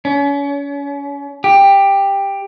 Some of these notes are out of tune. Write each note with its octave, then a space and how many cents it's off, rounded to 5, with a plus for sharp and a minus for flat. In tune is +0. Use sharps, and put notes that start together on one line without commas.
C#4 +35
G4 +10